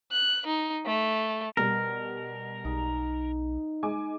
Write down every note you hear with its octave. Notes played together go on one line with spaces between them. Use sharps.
F#6
D#4
A3
B2 G3 A#4
B1 D#4
G#3 G#5 D6